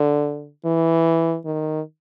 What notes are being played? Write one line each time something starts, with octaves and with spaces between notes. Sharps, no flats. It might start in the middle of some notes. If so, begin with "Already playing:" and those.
Already playing: D3
E3
D#3